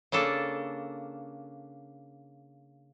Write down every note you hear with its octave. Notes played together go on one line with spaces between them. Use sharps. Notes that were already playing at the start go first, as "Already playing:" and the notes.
C#3 A#3 D4 A4